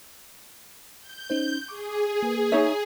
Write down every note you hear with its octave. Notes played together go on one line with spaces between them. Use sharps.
G6
C#4 D#4 C5
G#4 C#6 D6
A#3 B4
D#4 C#5 E5